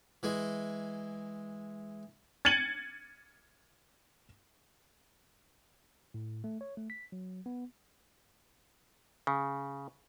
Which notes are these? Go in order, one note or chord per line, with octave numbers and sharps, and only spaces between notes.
E3 G#3
G#6 A6 C#7 D#7 F#7
A2
A3
C#5
A3
B6
F#3
B3
C#3